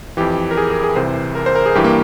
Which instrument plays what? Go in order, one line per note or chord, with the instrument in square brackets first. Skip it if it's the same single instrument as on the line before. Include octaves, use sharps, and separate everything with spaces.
[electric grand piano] F2 E3 G4
A#4
G#4
A#4
G#4
C2 C3 E3 C5
A#4
C5
A#4
G#4
G2 E3 G4
A#3